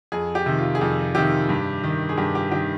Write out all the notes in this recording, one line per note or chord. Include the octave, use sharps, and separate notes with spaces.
F2 G#4
G4
C3 D#3
F4
G#4
F2 G4
C3 D#3 G4
G2
D#3
G#4
G2 G4
G4
D#3 G4